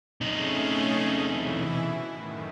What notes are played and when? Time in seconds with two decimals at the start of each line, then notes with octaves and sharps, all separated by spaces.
0.21 C3 A3 C#4 D#4 G#4
1.24 B2 E3 E4
2.08 F#2 A2 D#3